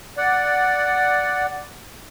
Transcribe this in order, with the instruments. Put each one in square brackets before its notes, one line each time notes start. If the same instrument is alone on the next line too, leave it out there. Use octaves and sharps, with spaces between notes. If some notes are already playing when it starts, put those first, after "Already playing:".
[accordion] D5 F#5